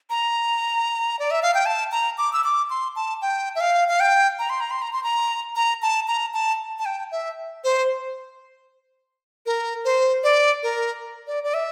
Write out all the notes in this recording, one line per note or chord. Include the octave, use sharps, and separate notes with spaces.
A#5
D5
E5
F5
G5
A5
A#5
D6
E6
D6
C6
A5
G5
E5
F5
F5
G5
A#5
C6
A#5
C6
A#5
C6
A#5
A#5
A5
A#5
A5
A5
G5
E5
C5
A#4
C5
D5
A#4
D5
D5
E5